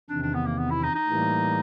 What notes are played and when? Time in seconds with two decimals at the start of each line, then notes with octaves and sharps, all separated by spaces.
0.09 E2 C3 D#3 D4
0.22 D4
0.34 B3
0.46 A#3
0.58 B3
0.71 E4
0.83 D#4
0.95 D#4
1.07 A2 E3 G3 A#3